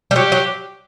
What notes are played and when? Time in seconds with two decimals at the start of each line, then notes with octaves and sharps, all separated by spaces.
0.11 G3
0.15 F#3 G4
0.32 F#3